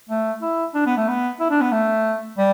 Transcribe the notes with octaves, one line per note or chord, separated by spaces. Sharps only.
A3
E4
D4
B3
A3
B3
E4
D4
B3
A3
G3